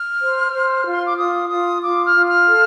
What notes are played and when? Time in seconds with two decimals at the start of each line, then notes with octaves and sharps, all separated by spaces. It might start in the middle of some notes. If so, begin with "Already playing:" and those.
Already playing: F6
0.20 C5
0.53 C5
0.86 F4
0.91 C6
1.04 D6
1.17 F4 D#6
1.50 F4 D#6
1.83 F4 D6
2.05 F6
2.15 F4
2.26 F6
2.47 A4